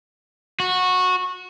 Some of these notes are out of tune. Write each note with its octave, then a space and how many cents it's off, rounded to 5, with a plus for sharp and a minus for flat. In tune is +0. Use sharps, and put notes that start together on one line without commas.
F#4 -15